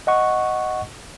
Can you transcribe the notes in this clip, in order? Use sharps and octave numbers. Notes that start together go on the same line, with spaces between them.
D#5 F#5 C#6